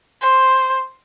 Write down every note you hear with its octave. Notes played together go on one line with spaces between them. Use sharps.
C5